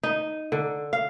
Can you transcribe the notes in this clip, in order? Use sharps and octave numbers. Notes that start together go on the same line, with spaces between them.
D#4
D3
F5